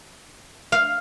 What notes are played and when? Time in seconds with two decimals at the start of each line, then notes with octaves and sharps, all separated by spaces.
0.72 F5